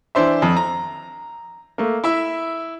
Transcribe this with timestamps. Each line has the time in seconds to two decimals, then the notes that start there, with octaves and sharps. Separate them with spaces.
0.15 E3 D4 C5 E5
0.42 F2
0.57 A#5
1.78 A3 A#3
2.04 E4 E5